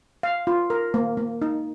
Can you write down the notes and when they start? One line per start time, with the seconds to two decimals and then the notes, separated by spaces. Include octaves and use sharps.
0.23 F5
0.47 F4
0.70 A#4
0.94 A#3
1.17 A#3
1.42 D#4